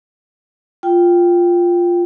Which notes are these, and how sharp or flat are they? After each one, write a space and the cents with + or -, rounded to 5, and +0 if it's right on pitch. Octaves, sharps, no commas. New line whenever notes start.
F4 +0 G5 +0